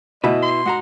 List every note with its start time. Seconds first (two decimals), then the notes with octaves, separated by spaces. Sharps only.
0.24 B2 E4 B4 D#5
0.42 C6
0.66 G#2 F#4 F#5 A#5